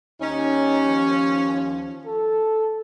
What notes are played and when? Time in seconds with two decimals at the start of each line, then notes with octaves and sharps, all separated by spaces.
0.20 D#2 C#4 D#4
0.87 F3
2.05 A4